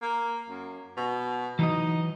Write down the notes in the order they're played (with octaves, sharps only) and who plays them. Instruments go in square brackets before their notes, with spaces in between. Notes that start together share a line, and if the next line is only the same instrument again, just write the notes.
[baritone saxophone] A#3
F#2
B2
[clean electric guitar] E3 F#3 D#5 [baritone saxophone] D#4